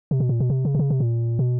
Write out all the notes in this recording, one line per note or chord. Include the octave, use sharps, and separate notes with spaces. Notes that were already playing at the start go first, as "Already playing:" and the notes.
C3
B2
A#2
B2
C3
C#3
C3
C#3
C3
A#2
B2